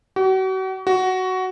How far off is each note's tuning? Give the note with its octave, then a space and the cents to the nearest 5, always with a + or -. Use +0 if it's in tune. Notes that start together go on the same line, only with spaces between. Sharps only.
F#4 +40
F#4 +10